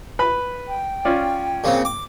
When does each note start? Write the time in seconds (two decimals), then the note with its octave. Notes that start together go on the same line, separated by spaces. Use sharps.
0.19 B4 B5
0.68 G5
1.05 C#4 F4 D5
1.64 A#2 C#3 C4
1.85 D6